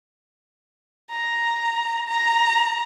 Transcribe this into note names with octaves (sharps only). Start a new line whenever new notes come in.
A#5
A#5